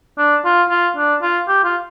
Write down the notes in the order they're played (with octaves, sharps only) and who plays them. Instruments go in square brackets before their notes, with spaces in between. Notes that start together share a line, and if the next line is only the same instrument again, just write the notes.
[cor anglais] D4
F4
F4
D4
F4
G4
F4